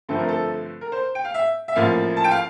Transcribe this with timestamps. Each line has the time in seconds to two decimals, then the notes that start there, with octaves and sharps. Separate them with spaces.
0.09 G2 D3 F3 A3 C4 A4
0.19 A#4
0.29 A4
0.81 A#4
0.92 C5
1.15 G5
1.25 F5
1.34 E5
1.68 E5
1.75 A1 A2 F3 A#3 F5
2.17 A5
2.24 G5
2.31 F5